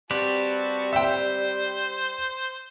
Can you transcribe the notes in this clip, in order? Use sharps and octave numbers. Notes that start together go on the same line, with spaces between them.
G3 C4 F#4 G4 B4 A5
C5 E5 G5